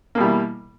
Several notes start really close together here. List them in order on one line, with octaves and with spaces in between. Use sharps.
A#3 B2 G3 E3